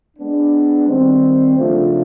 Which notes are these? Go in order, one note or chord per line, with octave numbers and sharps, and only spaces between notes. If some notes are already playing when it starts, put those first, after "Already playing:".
G#3 B3 D4
D#3 G3 C4
C#3 F3 A3 D4 F4